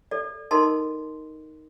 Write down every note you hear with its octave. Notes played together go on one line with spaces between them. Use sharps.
A4 D5
D#4 A4 A#4 D#5 A5 C6